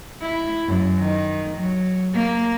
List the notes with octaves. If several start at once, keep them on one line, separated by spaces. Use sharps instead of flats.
E4
F#2
D#3
F#3
A#3